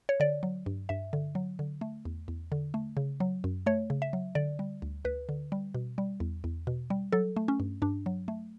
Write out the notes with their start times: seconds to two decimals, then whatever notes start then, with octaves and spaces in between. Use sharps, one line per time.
0.09 C#5
0.20 D3 D5
0.43 F#3
0.66 G2
0.89 G2 E5
1.13 D3
1.35 F#3
1.59 D3
1.81 A3
2.05 E2
2.28 E2
2.52 D3
2.74 A3
2.97 C#3
3.20 F#3
3.44 F#2
3.66 A3 C#5
3.90 C#3
4.02 E5
4.13 F#3
4.35 D3 D5
4.59 G3
4.82 D2
5.05 D2 B4
5.29 D3
5.52 G3
5.75 B2
5.98 G3
6.20 E2
6.44 E2
6.67 B2
6.90 G3
7.12 F#3 A4
7.36 A3
7.48 C#4
7.60 G2
7.82 G2 D4
8.06 F#3
8.28 A3